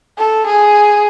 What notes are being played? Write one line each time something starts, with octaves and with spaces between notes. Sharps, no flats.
A4
G#4